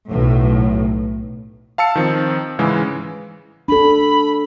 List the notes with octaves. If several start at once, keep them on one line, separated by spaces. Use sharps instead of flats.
B1 A2
F5 A5 E6 C#7
D#3 F3 C4
G#2 C#3 E3 G#3
D4 A4 B5